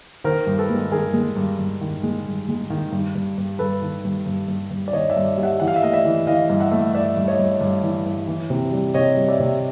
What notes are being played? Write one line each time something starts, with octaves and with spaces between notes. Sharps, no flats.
D#3 A#4 C5
G2
A4 B4
G#3
D#3 G#4 A#4
G#3
G2
G2
D#3
G#3
G2
G#3
D#3
G2
G2
G2
G2 A4 B4
D#3
G2
G2
G2
G2
D5
D#3 C#5 D#5
D5 E5
G2
G3
E5 F#5
E3 F#5
F5
E5
A3 D#5 F5
D5 E5
E3
E3 D#5 F5
G2
E5 F#5
A3
G2 D5 E5
G2
C#5 D#5
G2
G2
E3
G2
E3
C3
G3
C3 C#5 D#5
G3
D5 E5
C3